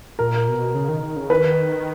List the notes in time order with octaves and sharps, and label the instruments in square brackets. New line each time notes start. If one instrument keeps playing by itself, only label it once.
[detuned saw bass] A#2 [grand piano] A#4
[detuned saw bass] B2
C#3
D#3
D#3
C#3
[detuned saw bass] D#3 [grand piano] B4